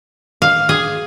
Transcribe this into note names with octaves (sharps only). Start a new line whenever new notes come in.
F5
G#4